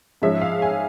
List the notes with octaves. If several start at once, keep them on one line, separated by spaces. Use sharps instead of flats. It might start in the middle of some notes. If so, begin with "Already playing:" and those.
G#2 F3 G#3 C#4 E5
F5
G#5